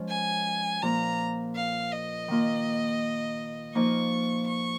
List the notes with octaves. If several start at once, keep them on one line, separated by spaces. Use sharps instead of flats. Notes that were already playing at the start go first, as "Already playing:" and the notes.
Already playing: F3 G#3 C#4
G#5
A#2 F3 A#3 F4 A#5
F5
D#5
D#3 A#3 F4
F3 A#3 D#4 C#6
C#6